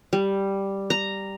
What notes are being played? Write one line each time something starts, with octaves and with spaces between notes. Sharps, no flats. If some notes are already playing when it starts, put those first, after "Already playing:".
G3
A#5